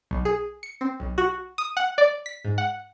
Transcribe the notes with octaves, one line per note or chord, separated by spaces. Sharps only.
B1
G#4
C#7
C4
B1
F#4
D#6
F#5
D5
B6
G#2
F#5